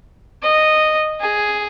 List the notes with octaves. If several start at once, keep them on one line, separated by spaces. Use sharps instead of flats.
D#5
G#4